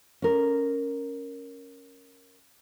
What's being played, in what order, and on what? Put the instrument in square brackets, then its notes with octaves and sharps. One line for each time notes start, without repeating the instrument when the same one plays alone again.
[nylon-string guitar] C#4 A#4